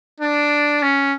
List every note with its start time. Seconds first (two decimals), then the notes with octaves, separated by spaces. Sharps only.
0.20 D4
0.82 C#4